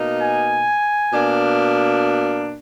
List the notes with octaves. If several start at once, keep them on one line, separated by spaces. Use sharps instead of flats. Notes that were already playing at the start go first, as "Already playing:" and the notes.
Already playing: B2 A#3 D#4
G#5
B2 A#3 D4